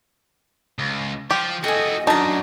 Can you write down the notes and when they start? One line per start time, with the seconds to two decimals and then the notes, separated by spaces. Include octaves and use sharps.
0.79 C#2
1.31 F3 G4
1.64 F#4 G#4 A4 D#5 G5 G#5
2.07 F#2 D4 D#4 F#4 A5 A#5